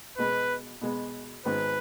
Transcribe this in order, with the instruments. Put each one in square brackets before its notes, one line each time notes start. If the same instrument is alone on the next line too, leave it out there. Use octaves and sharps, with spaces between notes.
[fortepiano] B2 G#3 B3 [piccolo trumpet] B4
[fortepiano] B2 G#3 B3
[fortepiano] G#1 G#2 G#3 B3 [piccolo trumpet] B4